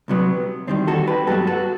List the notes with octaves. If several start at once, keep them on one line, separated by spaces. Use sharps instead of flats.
C2 C3 F#3 B3
E2 D#3 G3 C4
F#4 A4
G4 B4
G2 F#3 B3 F#4 A4
F#4 A4